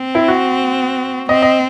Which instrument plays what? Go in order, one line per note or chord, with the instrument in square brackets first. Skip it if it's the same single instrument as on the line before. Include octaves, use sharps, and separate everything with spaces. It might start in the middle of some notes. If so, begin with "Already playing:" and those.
Already playing: [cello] C4
[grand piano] E4
F#4
[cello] C4 [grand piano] D#5
[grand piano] D#5